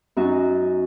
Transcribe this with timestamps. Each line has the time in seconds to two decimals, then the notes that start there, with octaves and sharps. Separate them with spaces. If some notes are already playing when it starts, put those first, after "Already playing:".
0.17 F#2 C#4 D#4 F#4